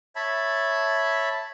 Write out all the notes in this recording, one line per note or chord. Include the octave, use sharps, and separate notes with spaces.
C#5 E5 A5 B5